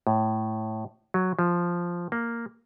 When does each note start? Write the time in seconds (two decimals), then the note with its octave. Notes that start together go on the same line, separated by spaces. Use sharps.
0.07 A2
1.14 F#3
1.39 F3
2.12 A#3